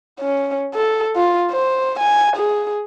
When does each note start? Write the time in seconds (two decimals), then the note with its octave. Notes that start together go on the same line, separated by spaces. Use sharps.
0.20 C#4
0.75 A4
1.17 F4
1.51 C5
2.00 G#5
2.37 G#4